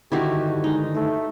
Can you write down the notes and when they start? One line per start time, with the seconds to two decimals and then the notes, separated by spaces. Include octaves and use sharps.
0.12 G2 D3 D#3 E4 F#4 G4
0.64 G#3 D#4
0.95 A3